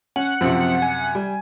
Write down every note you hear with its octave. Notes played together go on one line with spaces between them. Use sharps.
C#4 F#5
F#2 C3 F3 C4
G#5
G3